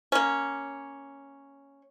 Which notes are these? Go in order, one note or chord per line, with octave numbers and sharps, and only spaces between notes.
A#3 C#4